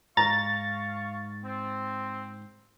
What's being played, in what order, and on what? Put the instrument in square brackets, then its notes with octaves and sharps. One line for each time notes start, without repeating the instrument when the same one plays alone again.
[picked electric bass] G#2 [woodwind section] F5 C#6 [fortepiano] A#5 [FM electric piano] A6
[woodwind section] C4